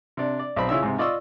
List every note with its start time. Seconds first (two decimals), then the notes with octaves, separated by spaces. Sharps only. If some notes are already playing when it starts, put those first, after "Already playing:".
0.17 C3 D4
0.39 D5
0.56 B1 C4 B5
0.69 C#3 E4 F4 C#5 E5 E6
0.82 G#2 C3
0.98 F4 D5 D#5 C#6 E6